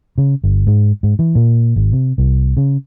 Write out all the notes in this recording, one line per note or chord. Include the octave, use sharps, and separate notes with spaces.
C#3
G1
G#2
G#2
E3
A#2
G#1
C3
C2
C#3